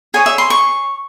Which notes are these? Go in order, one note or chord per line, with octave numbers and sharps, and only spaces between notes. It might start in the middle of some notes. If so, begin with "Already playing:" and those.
G#4 C#5 G#5
E5
C6
C#6